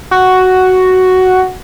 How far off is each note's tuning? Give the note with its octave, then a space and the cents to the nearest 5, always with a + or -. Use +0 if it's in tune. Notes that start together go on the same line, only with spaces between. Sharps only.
F#4 +5